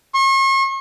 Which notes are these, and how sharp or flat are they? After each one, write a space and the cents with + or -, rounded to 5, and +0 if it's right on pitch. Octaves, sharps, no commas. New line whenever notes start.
C#6 -40